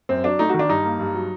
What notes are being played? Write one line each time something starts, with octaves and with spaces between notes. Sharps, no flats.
F#2 C4
F#3 D4
A3 D#4
D#3 F#4
D4
G2 D#4
A#3
G2
F#3